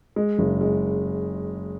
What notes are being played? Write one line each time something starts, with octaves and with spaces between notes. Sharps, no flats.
G#3
F#1
G#3